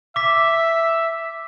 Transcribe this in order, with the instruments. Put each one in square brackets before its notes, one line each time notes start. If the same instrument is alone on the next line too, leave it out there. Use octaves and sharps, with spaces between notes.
[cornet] E5 [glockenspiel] D6 B6